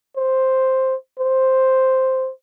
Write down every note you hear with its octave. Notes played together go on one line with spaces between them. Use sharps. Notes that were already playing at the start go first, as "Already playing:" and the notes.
C5
C5